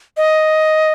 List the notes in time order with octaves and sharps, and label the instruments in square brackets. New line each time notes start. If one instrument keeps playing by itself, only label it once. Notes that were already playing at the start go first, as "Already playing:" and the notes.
[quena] D#5